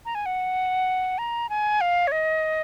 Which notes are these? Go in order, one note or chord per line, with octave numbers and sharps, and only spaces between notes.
A#5
G#5
F#5
A#5
G#5
F5
C#5
D#5